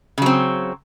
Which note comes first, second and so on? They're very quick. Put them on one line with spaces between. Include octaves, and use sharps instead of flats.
C#3 F#3 C4